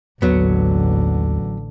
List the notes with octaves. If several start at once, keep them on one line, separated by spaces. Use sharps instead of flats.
A1 D#2 D3 F#3 B3